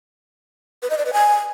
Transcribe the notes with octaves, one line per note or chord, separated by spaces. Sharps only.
B4
D#5
D5
B4
G#5